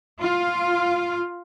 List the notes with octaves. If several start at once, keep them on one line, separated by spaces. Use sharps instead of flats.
F4